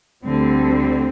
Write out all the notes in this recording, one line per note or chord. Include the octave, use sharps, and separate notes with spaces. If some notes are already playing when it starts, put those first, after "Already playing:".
D2 D3 G3 C4